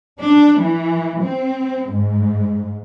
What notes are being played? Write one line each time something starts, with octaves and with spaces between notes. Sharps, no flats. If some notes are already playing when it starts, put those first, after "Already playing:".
D4
E3
C4
G#2